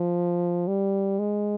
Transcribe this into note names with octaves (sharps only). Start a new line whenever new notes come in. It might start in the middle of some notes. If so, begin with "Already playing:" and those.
Already playing: F3
G3
G#3